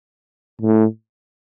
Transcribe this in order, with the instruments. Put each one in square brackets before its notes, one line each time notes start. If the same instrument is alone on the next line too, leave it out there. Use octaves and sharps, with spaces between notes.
[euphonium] A2